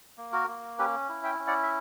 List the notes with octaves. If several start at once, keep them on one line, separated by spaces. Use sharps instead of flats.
A#3
F#4 A#4
A#3
C#4 G4 B4
E4
E5 G5
C#4
D5 F#5
E5